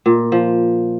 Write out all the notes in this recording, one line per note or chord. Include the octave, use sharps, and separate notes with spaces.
A#2
F3